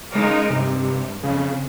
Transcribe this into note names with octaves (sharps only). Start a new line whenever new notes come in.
C#3 G#3 D#4 A#4
G2 C3
F2 C#3